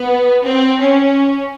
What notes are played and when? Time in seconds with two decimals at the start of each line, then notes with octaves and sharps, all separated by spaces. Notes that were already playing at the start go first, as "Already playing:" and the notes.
Already playing: B3
0.45 C4
0.79 C#4